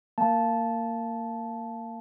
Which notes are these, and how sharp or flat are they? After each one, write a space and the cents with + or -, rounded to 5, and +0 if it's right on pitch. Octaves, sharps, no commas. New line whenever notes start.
A#3 -20 A5 -10